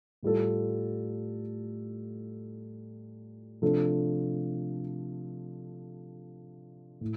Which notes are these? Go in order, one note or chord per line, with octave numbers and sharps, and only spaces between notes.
A2 G3 F4 A4
C3 F3 A3 D4 A4
A2